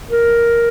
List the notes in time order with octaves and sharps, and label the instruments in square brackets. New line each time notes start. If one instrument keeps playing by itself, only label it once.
[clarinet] A#4